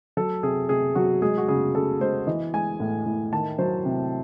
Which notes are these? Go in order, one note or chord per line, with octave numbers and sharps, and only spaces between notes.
F#3 A4
C3 G#4
C3 G#4
F#3 F#4
G#3 G#4
F#4
C#3 G#4
C#3 A4
G#3 C5
E3 D#5
G#3 G#5
A2
A2
D#3 A5
F#3 C5
C3